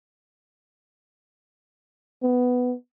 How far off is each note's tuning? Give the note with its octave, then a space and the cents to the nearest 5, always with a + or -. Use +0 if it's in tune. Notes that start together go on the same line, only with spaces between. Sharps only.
B3 +10